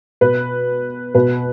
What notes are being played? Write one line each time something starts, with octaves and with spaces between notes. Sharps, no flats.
B2 B4
B2 B4